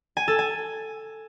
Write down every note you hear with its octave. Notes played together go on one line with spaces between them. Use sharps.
G#5
A4
G#5